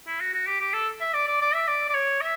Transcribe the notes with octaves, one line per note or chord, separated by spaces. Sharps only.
E4
F#4
F#4
G4
G4
A4
E5
D5
D5
D5
E5
D5
D5
C#5
E5